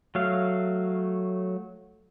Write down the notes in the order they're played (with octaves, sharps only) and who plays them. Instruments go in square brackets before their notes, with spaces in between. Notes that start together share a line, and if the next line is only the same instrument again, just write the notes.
[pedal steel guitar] F#3 A3 F5